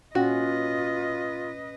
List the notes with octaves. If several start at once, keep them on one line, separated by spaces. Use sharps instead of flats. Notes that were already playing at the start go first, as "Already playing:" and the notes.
A#2 C#4 F4 F#4 B4 D#5